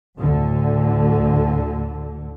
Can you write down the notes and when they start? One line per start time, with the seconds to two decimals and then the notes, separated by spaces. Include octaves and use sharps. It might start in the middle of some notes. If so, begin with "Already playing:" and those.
0.19 D2 A2 D3